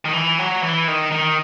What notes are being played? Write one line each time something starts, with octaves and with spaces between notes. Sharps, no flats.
D#3
E3
F#3
E3
D#3
D#3